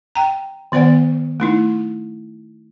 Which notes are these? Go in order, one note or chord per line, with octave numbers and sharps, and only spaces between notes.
G5 A#5
D#3 B3 C5 D5 F#5
A3 D#4 E4